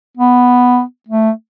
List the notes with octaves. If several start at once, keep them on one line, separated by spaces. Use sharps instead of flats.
B3
A3